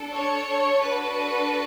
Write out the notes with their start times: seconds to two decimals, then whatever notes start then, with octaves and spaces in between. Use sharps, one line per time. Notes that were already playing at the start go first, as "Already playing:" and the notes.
Already playing: D4 A4
0.13 C#5
0.81 D4 F#4 A4 B4